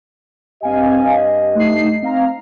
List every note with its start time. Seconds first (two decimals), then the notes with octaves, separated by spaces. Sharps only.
0.63 G2 C4 G4 D#5 F5 G#5
1.55 A3 D#4 C7
2.03 C4 F5 A#5